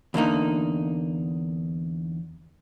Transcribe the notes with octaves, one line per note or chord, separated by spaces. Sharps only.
E2 D3 A#3 D#4